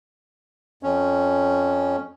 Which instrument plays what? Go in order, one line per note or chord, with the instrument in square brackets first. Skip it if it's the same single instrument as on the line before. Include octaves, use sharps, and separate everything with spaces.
[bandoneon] F2 C#4